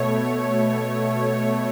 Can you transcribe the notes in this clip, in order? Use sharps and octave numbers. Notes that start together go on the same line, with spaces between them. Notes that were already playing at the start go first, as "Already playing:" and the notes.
Already playing: B2 A3 C#5